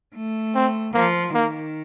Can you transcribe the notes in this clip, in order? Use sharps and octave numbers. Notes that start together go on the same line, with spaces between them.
A3
C4
F3 A#3
D#3 A#3